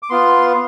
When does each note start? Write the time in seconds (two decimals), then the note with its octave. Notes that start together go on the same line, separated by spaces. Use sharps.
0.03 D6
0.10 B3 F4 C6